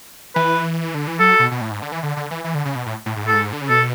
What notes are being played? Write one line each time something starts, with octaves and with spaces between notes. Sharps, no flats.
E3 B4
D3
E3
F#3 A4
B2
B2
A2
G#2
D3
E3
D3
D3
E3
E3
D3
C#3
B2
A2
A2
G#2
A2
G#2 A4
D3
C#3
B2 A4